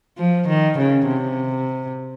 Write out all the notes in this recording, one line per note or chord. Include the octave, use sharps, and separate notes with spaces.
F3
D#3
C#3
C3